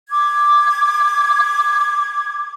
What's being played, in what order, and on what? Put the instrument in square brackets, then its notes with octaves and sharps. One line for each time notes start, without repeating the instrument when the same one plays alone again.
[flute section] D6 G#6